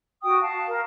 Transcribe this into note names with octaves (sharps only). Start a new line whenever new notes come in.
F#4 G5 D#6
F5 A5
A#4